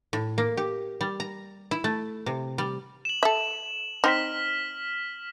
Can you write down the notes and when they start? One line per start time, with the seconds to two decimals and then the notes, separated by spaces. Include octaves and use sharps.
0.13 A2
0.38 A#3
0.57 G4
1.01 G3
1.20 A#5
1.71 E4
1.84 A3
2.26 C3
2.58 G3
3.05 E7 F#7
3.23 A4 E5
4.04 C4 D#4 F6 B6